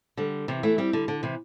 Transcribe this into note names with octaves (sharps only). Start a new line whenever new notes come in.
D3 G3
C3 E3
E3 A3
G3 C4
D3 G3
D3
C3 E3